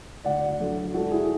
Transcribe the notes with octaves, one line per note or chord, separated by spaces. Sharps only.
D2 D5 F#5
D3 F#3 A3
G#2 F#4 A4
E4 G#4